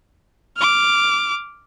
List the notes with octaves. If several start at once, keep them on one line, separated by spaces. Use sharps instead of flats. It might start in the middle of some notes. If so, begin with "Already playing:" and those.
D6 F6